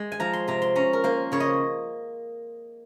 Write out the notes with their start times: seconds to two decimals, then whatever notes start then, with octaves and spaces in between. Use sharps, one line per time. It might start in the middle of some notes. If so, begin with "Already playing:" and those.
Already playing: G#3
0.12 G#5
0.20 F3 A#5
0.33 C6
0.48 C3 A#5
0.62 C6
0.76 C#4 A#5
0.93 A#4
1.04 A#3 C5
1.32 C#3 C#5
1.40 D#5